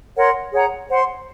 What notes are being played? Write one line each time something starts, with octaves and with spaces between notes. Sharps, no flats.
A#4 C#5 F#5 C6
G#4 C#5 F#5 A#5
C5 F#5 C6